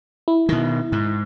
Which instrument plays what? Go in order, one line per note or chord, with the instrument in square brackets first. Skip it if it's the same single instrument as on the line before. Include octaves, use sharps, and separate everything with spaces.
[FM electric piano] E4
[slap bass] B2 D#3
G#2